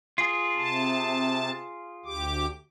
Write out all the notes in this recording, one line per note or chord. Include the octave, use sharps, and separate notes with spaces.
F4 G#4
C3 A5
D2 G4 D6